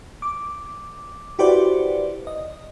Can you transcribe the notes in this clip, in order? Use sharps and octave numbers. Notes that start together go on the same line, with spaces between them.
D6
E4 F#4 G4 B4 C5 D5
D#5